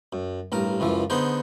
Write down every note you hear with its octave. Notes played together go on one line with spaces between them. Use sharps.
F#2
A1 G2 A#4
C#2 F#2 E3 F3
D3 B3 D#4 G#4 C5